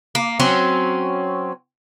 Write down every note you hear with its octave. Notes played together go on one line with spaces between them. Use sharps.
A#3
F#3 C4 C#4